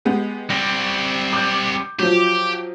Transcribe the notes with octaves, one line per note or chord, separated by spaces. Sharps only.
G#3 B3 G4
G3 C4 A#6
D6 G6
F3 F#3 G4